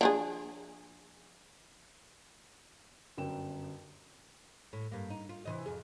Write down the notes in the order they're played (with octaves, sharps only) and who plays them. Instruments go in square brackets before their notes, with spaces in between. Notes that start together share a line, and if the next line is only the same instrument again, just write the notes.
[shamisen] F3 D4 G#4
[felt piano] G1 F#2 G5 E7
[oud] A2
G2 A#3
D#4
F4
C3 E3 D#5
F2 G#4